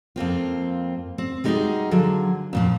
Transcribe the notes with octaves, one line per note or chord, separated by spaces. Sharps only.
F2 A#3 C4 F4
C4
G3 G#3 D#4 F4 F#4 G#4
D3 F3 F#3 G#4
F2 A#2 F3